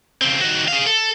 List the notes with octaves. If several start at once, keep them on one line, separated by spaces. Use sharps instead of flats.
C#3 C4
D#3 F#4
G#4 F5
A4